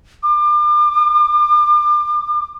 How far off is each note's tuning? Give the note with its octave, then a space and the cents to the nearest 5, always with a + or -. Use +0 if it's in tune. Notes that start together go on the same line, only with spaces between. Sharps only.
D6 +35